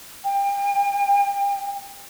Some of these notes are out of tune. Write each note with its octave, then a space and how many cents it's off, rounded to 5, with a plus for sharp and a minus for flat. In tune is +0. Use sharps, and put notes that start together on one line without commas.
G5 +40